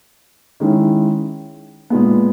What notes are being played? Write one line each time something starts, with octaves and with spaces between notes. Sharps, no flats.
D#3 G#3 C#4 E4
A#2 G#3 B3